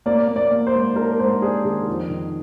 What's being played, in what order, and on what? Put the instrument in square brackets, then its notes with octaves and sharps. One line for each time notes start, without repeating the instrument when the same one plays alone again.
[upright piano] A#3 D5
A#3
D5
A#3
C5
G#2
D4 A#4
G#2 C5
D4 G#4
D#3 G#4
F2
D#3